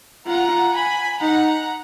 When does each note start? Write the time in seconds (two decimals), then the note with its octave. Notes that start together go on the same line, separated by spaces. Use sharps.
0.27 F4 F#5 A#5
0.73 G#5 B5
1.20 D#4 F#5 A#5